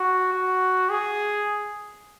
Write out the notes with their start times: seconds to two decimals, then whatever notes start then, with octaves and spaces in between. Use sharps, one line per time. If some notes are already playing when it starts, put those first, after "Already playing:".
Already playing: F#4
0.33 F#4
0.90 G#4